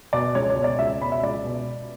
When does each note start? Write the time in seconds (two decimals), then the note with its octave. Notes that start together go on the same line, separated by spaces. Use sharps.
0.13 B2 D5
0.35 C#2 C#5
0.50 C#5
0.57 B2
0.64 D5
0.79 C#2 E5
1.01 B2 B5
1.12 E5
1.23 C#2 D5
1.45 B2